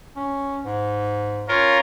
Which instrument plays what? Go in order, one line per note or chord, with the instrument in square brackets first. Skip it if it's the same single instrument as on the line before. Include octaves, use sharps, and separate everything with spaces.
[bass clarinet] C#4
G#2
[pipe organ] C#4 F4 A#4